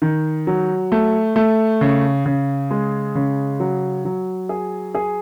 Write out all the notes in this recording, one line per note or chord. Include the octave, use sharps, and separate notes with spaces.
D#3
F#3
A3
A3
C#3
C#3
G#3
C#3
F#3
F#3
G#4
G#4